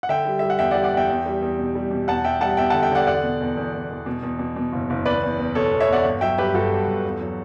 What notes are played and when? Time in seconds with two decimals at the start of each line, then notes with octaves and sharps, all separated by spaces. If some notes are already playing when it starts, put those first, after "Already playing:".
0.03 F#5
0.09 D3 E5 G5
0.26 G3
0.39 G3 E5
0.50 F#5
0.59 E2 E5 G5
0.71 D5 F#5
0.75 G3
0.84 D5 F#5
0.93 E2 E5 G5
1.09 E2
1.26 G3
1.42 E2
1.59 B2
1.75 G3
1.91 B2
2.08 E2 F#5 A5
2.24 E2 E5 G5
2.41 G3 F#5 A5
2.57 E2 E5 G5
2.70 D3 F#5 A5
2.82 E5 G5
2.91 D3 D5 F#5
3.07 E2 D5 F#5
3.24 B2
3.41 E2
3.57 E2
3.74 E2
3.90 E2
4.06 B2
4.23 E2
4.39 B2
4.56 B2
4.72 F#1
4.90 F#1
5.06 E2 B4 D5
5.22 E2
5.39 E2
5.55 B2 A4 C#5
5.72 E2
5.80 C#5 E5
5.89 E2 D5 F#5
6.05 G1
6.21 F#3 E5 G5
6.38 G2 G4 B4
6.54 G1 F#4 A4
6.71 G2
6.88 G1
7.05 E2
7.21 F#3